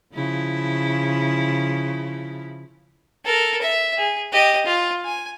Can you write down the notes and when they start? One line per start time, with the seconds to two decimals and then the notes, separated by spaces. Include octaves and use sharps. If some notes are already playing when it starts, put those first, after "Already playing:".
0.15 C#3 F3 E4
3.25 A4 A#4
3.61 E5
3.97 G#4
4.32 G4 D#5
4.65 F4
5.05 G#5